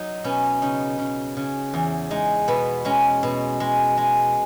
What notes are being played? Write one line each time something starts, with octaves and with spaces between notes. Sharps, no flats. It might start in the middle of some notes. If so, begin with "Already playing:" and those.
Already playing: F#3 D#4
B2 C#4
C#3 D#4
C#3
C#3
E2
G#3 D#4
B2 B3
G#3 C#4
B2
G#3
G#3